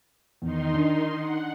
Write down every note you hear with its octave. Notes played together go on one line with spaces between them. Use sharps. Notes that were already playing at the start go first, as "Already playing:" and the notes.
E2 D#3 D#4 C6
D4
F#5